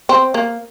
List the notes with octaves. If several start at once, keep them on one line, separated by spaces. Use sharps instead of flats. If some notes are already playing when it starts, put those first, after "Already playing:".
C4
A#3